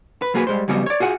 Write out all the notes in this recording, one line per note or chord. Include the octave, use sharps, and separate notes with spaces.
B4
F#3 A#3 F#4 G#4 A4 B4
G3 G#3 C5
F2 C#3 F#3 G3 B3 D#5
C#5 D5
F4 F#4 G#4 F#5